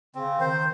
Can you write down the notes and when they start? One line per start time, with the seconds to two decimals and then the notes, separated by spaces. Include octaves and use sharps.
0.15 C#3 C4
0.39 D#3 C5